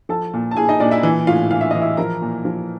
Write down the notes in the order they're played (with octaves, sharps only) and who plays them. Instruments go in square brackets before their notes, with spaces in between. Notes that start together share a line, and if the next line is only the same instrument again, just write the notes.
[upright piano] F3 A4 A5
A#2
A5
A#2 G#4 G#5
D#4 D#5
A#2 D4 D5
E4 E5
E3
A2 F4 F5
E3 F5
E5
E3 D#5
E4 E5
F3 A#4 A#5
A#2
F3